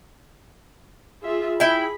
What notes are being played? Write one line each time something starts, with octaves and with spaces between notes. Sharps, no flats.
F4 G#4 E5
E4 G#4 G5 B5